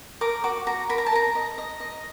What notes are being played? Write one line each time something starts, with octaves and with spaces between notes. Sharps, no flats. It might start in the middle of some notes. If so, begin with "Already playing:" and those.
A#4 D6
F#4 D6
F#4 A#5
A#4 B5
A#5
A5
A#4 A#5
D#5
D#5
D#5